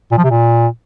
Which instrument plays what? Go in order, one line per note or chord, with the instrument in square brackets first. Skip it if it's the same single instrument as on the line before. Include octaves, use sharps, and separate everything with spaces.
[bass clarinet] A#2
F3
C3
A#2